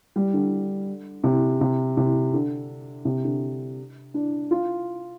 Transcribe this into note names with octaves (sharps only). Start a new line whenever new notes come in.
G3
D3
C3
C3
C3
D3
C3
D3
D4
F4